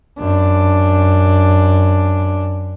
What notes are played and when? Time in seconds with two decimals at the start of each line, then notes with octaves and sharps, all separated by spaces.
0.19 F#2 D4